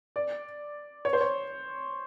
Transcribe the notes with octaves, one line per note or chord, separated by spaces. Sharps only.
D5
C#5
C5
C#5